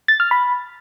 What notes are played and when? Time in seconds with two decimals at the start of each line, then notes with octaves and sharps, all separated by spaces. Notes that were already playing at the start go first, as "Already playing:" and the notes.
0.08 A6
0.20 F6
0.31 B5